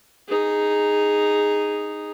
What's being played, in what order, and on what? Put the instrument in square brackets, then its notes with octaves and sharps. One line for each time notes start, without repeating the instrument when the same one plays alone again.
[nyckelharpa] D#4 G#4